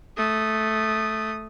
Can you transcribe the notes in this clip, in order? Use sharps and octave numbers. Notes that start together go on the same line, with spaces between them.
A3 D#6